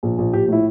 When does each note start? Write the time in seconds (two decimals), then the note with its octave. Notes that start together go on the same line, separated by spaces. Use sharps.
0.03 A#1
0.18 A#1
0.33 A#1 G4
0.48 A2 E4